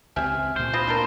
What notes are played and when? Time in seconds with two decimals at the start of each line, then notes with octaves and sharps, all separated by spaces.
0.16 C#2 A3 C4 G4 E5 G#5 F6
0.56 D2 A#2 C5
0.73 C4 F4 B5 D#6 A#6
0.87 D4 F4 A#4